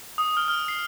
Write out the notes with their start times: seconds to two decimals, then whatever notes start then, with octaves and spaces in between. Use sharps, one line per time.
0.18 D#6
0.37 F6
0.48 F6
0.68 C7